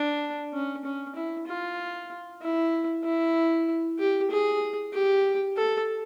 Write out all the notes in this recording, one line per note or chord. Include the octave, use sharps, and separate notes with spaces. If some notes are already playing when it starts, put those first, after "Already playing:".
Already playing: D4
C#4
C#4
E4
F4
E4
E4
G4
G#4
G4
A4